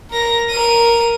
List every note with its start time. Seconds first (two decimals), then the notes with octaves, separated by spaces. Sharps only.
0.11 A#4 A#6
0.50 A#4 D#7